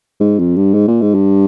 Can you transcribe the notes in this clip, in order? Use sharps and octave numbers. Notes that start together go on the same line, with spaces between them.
G#2
F2
G2
G#2
A#2
G#2
G2